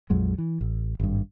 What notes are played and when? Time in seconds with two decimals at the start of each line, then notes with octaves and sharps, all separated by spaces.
0.10 A#1 F2 F#3 G#3
0.38 E3
0.61 A1
1.00 G#1 G2